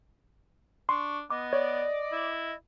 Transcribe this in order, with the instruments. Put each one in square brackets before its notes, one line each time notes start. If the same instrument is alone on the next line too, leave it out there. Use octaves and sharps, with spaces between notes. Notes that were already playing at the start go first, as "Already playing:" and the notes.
[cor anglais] D4 [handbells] C6 [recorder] C#6
[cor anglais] B3 [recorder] D#5 [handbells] D6
[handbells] C#5 [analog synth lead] D5
[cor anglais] E4